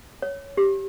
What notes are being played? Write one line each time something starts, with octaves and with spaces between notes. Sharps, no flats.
C#5
G4